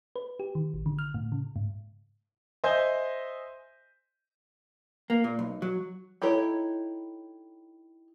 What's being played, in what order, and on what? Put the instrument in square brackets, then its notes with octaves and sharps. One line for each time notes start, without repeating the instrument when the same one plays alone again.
[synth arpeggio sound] B4
G4
D#3
A1
D3
F6
A2
C#3
G#2
[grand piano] C5 D#5 E5 G#5 G6
[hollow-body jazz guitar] A#3
A#2
B1
F#3
[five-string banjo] D#4 E4 G4 A4 C#5